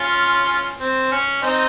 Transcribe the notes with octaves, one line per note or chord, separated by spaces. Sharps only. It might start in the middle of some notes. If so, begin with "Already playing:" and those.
Already playing: C#4 F4
C4
C#4
C4 D#4